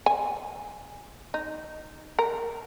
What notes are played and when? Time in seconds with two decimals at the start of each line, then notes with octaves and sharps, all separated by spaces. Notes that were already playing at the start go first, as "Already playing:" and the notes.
0.06 G#5
1.34 D#4
2.19 A#4